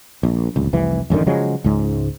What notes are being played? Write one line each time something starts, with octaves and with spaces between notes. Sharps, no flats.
A#1
D1 C#2
F1 C2 E3
A1 F#2 D3 D#3
C#3 F3 F#3 G#3
C#2 G#2